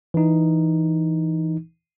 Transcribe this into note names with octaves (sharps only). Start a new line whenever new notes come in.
E3 D#4